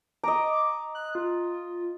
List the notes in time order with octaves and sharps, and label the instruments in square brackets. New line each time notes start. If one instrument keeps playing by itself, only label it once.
[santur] D#5 A#5 [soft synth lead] D6
[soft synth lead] F#6
F4